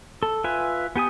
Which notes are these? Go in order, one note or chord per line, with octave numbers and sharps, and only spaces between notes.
A4
F4 B4 E5 G#5
B3 G4 G#5 D#6